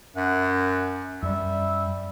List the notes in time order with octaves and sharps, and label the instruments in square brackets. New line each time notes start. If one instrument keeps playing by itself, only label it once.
[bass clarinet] F#2 [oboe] F#5
[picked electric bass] F#2 [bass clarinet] G3 [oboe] E5